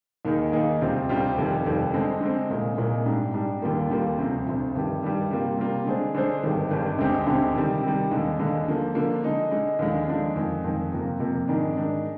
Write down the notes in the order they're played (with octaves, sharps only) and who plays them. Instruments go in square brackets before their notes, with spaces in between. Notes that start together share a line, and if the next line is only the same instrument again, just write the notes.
[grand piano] D#2 D#3 A#3 D#4 G#4
D#2 D#3 A#3 D#4 G#4
D2 C3 G3 C4 F4
D2 C3 G3 C4 F4
F1 F2 D#3 G3
F1 F2 D#3 G3
D3 G#3 C4
D3 G#3 C4
C2 A#2 G#3
C2 A#2 G#3
G#2 G3 D4
G#2 G3 D4
D#2 D3 G3 A#3 F4
D#2 D3 G3 A#3 F4
D2 C3 F3
D2 C3 F3
G2 D#3 G3
G2 D#3 G3
C3 G3 A#3 F4
C3 G3 A#3 F4
D3 G#3 D4 G#4 C5
D3 G#3 D4 G#4 C5
G#1 G2 D#3 G3
G#1 G2 D#3 G3
D2 D3 G#3 C4 G4
D2 D3 G#3 C4 G4
C3 D#3 G3
C3 D#3 G3
D#2 D3 G#3
D#2 D3 G#3
D3 F3 A#3
D3 F3 A#3
D3 G#3 D#4
D3 G#3 D#4
D#2 D3 F3 G#3 D4
D#2 D3 F3 G#3 D4
F2 D#3 G#3
F2 D#3 G#3
F2 C3 F3 A#3
F2 C3 F3 A#3
G#2 D#3 G#3 D4
G#2 D#3 G#3 D4